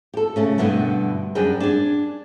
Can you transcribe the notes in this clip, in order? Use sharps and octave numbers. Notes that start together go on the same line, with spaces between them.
G4 A4
C#3 A3 C#4
G2 B2 D3 A3 B3 E4
F#2 G3 D4 G#4 G5
D4 G#4